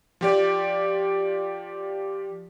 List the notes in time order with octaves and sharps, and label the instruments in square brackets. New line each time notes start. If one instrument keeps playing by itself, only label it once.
[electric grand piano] F3 G4 D5